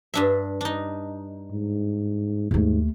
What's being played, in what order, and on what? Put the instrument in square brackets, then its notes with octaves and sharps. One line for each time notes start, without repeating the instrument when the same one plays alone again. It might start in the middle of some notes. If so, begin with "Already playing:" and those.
[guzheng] G2 D4 E5
D4 D#4
[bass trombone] G#2
[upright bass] D#2 A3 [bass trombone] G#2